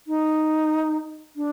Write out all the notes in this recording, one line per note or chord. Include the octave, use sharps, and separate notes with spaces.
D#4
D4